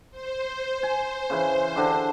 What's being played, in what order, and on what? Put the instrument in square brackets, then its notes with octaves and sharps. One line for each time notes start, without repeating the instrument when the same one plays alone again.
[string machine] C5
[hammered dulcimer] G#5
C#3 E3
D3 D4 G4